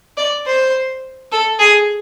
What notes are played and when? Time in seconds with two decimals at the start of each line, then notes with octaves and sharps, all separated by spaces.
0.17 D5
0.46 C5
1.32 A4
1.59 G#4